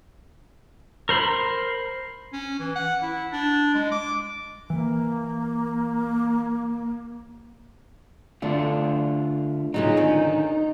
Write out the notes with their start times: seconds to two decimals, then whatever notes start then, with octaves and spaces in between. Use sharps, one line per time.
1.09 A#4 C5 B5
2.33 C#4
2.60 E3
2.76 F#5
3.02 E4
3.33 D4
3.74 G#3
3.91 D6
4.70 E3 A#3
8.42 D3 A3 D4 F4
9.74 A#2 C#3 F#3 D#4
9.97 D3 D#3 C#4